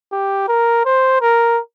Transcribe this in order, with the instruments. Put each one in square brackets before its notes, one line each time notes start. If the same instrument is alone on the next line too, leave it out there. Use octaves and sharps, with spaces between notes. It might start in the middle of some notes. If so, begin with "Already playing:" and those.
[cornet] G4
A#4
C5
A#4